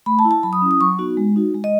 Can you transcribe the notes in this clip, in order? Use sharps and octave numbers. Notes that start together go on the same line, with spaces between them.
A3 B5
A5
E4
A5
F#3 B5
D#6
C#4 E4
D#6
F#3 C#6
B3 D#4 F#4
G#3
D#4 F#4
G#3
D#5